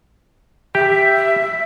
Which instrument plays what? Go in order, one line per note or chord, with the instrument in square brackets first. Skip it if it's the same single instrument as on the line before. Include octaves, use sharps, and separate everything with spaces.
[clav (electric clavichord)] G4 [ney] E5